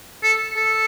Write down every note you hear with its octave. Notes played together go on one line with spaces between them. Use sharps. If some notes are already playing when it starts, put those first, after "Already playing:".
A4
A4